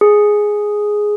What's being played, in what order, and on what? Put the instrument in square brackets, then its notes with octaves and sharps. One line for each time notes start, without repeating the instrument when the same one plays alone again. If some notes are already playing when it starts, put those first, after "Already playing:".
[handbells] G#4